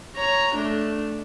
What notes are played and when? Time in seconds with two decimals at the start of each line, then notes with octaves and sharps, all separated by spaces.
0.16 C#5 A#5
0.55 A3 D4